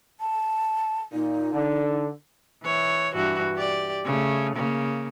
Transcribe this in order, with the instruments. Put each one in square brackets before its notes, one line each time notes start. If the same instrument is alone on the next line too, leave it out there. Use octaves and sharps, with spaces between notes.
[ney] A5
[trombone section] A#2 [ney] D#4
[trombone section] D3
[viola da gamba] E3 C#5
G2 E3 F#4
G4 D5
C#3 A3
C#3 A#3